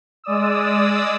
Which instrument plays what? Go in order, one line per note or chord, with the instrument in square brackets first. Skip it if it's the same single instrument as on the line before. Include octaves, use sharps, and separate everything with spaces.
[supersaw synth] G#3 D5 D#6 E6